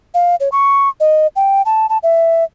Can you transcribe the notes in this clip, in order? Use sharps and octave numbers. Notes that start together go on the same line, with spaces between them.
F5
C#5
C#6
D#5
G5
A5
A5
E5